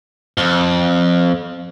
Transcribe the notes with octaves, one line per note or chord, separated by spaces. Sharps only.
F2